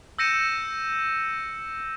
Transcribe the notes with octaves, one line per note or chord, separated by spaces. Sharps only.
E6 G6 A#6 C#7 D#7 E7